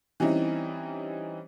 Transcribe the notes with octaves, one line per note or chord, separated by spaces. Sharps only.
E3 G3 C4 C#4 D#4 E4